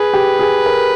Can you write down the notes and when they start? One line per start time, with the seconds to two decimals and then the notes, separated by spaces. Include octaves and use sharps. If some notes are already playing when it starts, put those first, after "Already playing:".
Already playing: G#4 B4
0.13 G4
0.39 G#4
0.66 A#4